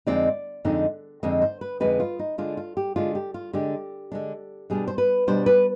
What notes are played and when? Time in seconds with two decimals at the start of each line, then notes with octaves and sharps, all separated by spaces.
0.07 F2 D3 G#3 C4 D#4 D5
0.65 F2 D3 G#3 C4 D#4
1.23 F2 D3 G#3 C4 D#4 D#5
1.42 C5
1.61 B4
1.80 F2 D3 G#3 C4 D#4 B4
2.00 F4
2.19 D#4
2.38 D3 G#3 D4 F4
2.57 F4
2.77 G4
2.96 D3 G#3 D4 F4
3.15 G4
3.34 F4
3.53 D3 G#3 D4 G4
4.12 D3 G#3 D4
4.70 B2 G3 D4 G#4
4.88 C5
4.98 B4
5.27 B2 G3 D4 C5
5.46 B4